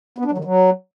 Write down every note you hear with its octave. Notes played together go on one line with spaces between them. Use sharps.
B3
D4
F#3
D#3
F#3